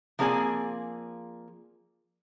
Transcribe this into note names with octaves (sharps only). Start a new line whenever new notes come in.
F3 A#3 C4 G#4 D5 G#5